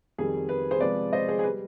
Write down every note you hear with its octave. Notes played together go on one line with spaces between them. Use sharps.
F2 D#3 G3 G#4
B4
G#4 C5
C3 F3 G#3 B4 D5
C5 D#5
G#4 C5
G#4
B4
G3